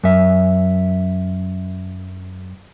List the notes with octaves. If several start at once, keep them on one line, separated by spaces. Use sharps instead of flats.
F#2 E5